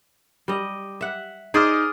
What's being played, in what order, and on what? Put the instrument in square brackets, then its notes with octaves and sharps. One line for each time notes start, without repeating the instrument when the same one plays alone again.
[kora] G3 D#5
E5 F#5
[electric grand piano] D#4 D#6 F6 [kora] G#4 C5 D5